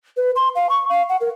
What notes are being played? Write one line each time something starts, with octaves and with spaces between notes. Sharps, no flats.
B4
C6
F5
C#6
F5
F#5
A#4